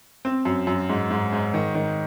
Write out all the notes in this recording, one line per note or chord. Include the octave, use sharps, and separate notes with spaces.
C4
F#2
F#2
G#2
G#2
G#2
D#3
D#3